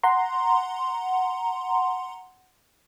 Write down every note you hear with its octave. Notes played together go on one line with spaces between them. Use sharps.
F#5 A#5 C6